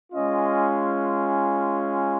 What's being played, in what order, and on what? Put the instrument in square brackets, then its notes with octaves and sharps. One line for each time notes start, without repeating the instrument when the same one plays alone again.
[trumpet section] G#3 C#4 F4 D#5